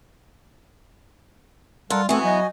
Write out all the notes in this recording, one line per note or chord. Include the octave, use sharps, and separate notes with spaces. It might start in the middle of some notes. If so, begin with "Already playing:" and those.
G3 F4 A4 A#4 F#5
E3 A3 B3 C4 F#4 G#5
F#3 D#5